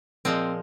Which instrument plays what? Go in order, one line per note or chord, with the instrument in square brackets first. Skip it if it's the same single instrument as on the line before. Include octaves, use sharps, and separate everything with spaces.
[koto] A#2 F3 G#3 C4